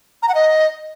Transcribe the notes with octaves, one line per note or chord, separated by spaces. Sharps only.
A#5
F#5
D#5